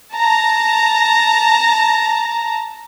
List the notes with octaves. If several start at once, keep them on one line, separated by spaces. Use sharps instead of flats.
A5 A#5